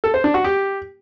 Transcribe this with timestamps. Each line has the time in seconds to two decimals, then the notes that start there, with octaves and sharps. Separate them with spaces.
0.04 A4
0.14 C5
0.24 D4
0.34 F#4
0.44 G4